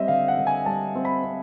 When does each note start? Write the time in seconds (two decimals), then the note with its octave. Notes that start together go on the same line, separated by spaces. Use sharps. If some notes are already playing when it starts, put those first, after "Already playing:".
Already playing: G3 C4 D#5 E5
0.08 D3 F5
0.28 F#5
0.38 D3
0.47 G#5
0.66 G3 A5
0.95 C4
1.05 B5
1.24 C4